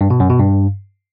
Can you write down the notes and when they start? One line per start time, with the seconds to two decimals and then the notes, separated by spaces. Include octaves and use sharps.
0.01 G2
0.10 B2
0.20 F#2
0.30 B2
0.40 G2